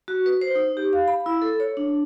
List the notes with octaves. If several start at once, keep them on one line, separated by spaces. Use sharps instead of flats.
F#4
B4
C5
D#4
G4
F5
B5
E4
A4
C#5
D4